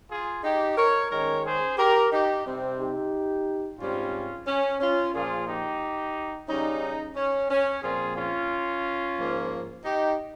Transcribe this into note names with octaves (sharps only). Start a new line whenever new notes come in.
F4 G#4
D#4 G4
A#4 C#5
D#3 G#3 C#4 A#4 C#5
G#4 C5
G4 A#4
D#4 G4
C3 G3 C4
D#4 G4
G#2 G3 C4 C#4 F4
C#4
C#4 F4
A#2 F3 A#3 F4 G#4
D#4 G4
C#3 G3 C#4 D#4
C#4
C#4
A#2 F3 C4 F4 G#4
C#4 F4
G#2 F3 A#3
D#4 G4